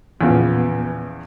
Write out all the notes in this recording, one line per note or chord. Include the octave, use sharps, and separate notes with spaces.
E2 A#2 C#3 E3 F3 B3